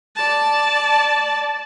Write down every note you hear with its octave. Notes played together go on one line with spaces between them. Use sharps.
D5 A5